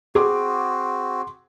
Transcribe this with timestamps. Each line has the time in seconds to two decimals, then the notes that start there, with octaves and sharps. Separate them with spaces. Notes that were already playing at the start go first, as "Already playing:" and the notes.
0.15 C4 F#4 G#4 D6